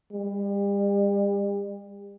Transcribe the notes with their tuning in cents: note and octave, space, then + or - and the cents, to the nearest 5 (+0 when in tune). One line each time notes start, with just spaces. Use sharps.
G3 +40